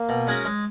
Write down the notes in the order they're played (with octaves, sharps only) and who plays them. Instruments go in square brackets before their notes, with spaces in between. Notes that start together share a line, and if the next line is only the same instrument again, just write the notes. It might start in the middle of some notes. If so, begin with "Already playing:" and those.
Already playing: [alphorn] A#3
[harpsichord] B2
G#3 C#4 F#4 A#4
G#3